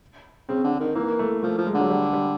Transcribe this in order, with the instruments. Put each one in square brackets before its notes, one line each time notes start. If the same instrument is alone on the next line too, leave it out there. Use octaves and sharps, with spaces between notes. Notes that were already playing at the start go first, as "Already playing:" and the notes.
[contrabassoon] C#3 [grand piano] C4
[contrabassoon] D3
D#3
[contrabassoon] E3 [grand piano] A#3
[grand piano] A3
[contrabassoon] F3 [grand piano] A3
[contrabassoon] F3
[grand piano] G#3
[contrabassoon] D3
[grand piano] F#3
G3
G3